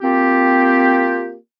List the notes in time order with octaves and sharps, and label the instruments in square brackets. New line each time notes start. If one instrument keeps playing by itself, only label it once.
[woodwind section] A#3 C4 F4 G4